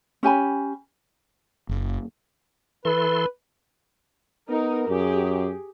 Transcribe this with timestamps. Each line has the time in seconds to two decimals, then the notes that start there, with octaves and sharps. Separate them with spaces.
0.23 C#4 G4 G#5 B5
1.69 F#1
2.85 E3 A4 B4 C6
4.49 B3 D#4 A#4
4.89 F#2 G4 G#4